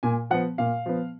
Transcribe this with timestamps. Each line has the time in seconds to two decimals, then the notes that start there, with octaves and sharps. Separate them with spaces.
0.03 A#2 G#5
0.30 F3 B3 F#5
0.58 A#2 F5
0.86 F3 B3